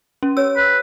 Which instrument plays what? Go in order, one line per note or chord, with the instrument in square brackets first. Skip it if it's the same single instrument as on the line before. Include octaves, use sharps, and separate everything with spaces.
[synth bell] C#4
[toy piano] G4 C#5 [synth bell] E6
[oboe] B4